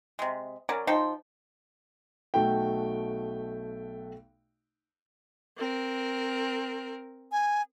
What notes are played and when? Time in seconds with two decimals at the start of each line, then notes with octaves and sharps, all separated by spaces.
0.19 C3 G#3
0.69 F#3 C#4 A#4 D5
0.87 F3 D#4 C5 G5
2.34 B1 A3 F#4 G5
5.58 C4 A#4
7.32 G#5